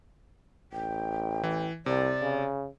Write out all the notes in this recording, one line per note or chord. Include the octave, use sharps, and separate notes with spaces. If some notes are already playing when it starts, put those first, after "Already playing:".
A1 G5
E3
C2 C3 D5
C#3